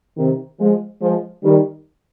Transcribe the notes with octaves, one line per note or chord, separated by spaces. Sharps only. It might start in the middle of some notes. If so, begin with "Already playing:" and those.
C3 D#3
F3 G#3
F3 G#3
D#3 G3